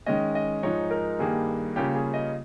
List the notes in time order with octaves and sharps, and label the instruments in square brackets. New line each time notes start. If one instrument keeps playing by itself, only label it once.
[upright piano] D#3 G#3 C#4 D#5
D#5
G#2 F3 G#3 D#4 C#5
A#4
G2 D#3 G3 A#3 G#4
C#3 G3 A#3 C#4 F4 G4
G#4
D#5